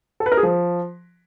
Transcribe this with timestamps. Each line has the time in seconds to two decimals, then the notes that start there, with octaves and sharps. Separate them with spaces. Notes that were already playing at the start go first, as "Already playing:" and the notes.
0.20 A4
0.26 B4
0.32 A#4
0.37 G#4
0.43 F3